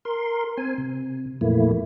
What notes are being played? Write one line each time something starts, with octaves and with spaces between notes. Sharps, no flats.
A#4 C6
C4 G#5
C3
F2 A#2 E3 A3 A#3 E4